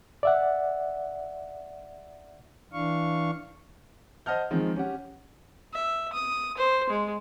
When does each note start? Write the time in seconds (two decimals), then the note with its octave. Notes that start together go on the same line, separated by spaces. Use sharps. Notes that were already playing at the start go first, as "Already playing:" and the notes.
0.23 D5 E5 F#5
2.73 E3 D4 F5 C#6
4.26 C5 D#5 F#5 A5 F6 G6
4.51 D#3 F3 G#3 C4
4.76 C#4 G4 F#5
5.73 E5
6.13 D#6
6.57 C5
6.90 G#3